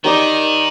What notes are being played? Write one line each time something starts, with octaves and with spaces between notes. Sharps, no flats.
D#3 D#4 G4 D5